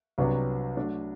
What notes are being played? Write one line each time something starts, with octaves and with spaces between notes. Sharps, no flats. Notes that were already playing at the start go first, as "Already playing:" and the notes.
C2 C3 F#3 B3 D4
F#3 A3 D4